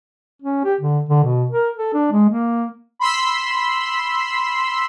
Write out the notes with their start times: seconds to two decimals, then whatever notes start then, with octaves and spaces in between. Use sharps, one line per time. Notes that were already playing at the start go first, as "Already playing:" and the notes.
0.42 C#4
0.64 G4
0.81 D3
1.09 D3
1.23 B2
1.50 A#4
1.77 A4
1.94 D4
2.12 G#3
2.29 A#3
2.99 B5 C6 E6 B6